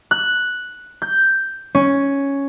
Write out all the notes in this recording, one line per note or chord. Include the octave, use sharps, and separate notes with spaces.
F#6
G6
C#4